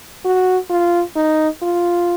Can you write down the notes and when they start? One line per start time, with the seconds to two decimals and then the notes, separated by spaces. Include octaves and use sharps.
0.25 F#4
0.70 F4
1.16 D#4
1.63 F4